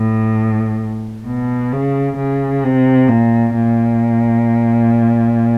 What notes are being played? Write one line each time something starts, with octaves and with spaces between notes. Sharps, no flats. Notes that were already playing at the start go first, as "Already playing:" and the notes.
Already playing: A2
B2
C#3
C#3
C3
A#2
A#2